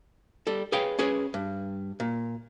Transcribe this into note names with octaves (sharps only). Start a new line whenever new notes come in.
G3 A4
G#4 B4 C#5 F5 G5
C#4 G#4 B4 C#5
G2
A#2